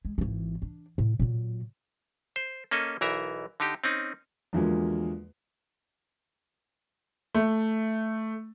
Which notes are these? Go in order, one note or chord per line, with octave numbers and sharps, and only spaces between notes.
G#3
G#1 E3
D4
A2
A#2 F#3
C5
A#3 C#4 A4 D#5
B1 E3 A#4 E5
D3 D#4 G4
C4 C#4 D#4
E2 D3 F3 F#3 G#3 A#3
A3